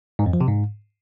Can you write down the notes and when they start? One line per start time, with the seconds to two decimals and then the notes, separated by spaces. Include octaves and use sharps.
0.19 G#2
0.26 F2
0.33 F3
0.41 C3
0.48 G#2